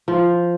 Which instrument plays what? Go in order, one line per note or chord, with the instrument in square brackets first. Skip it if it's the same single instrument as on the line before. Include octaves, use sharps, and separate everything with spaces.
[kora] F3